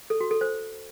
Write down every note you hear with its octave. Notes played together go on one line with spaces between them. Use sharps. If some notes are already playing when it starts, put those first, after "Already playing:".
A4
F#4
A4
C5